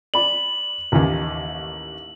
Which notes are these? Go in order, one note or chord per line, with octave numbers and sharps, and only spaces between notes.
D5 B5 F#7
A1 D#2